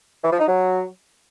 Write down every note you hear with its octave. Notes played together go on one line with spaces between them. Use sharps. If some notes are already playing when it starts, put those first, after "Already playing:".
E3
F3
D#4
F#3